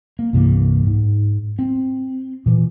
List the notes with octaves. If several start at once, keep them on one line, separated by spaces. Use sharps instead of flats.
A#3
C2 G2 E3 A#3
G#2
C4
A#2 E3